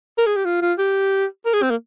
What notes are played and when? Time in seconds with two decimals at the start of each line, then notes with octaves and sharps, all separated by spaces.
0.18 A#4
0.26 G#4
0.36 G4
0.45 F4
0.61 F4
0.78 G4
1.46 A#4
1.54 G#4
1.62 C4
1.70 A#3